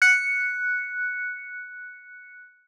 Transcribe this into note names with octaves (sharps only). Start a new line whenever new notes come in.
F#6 C#7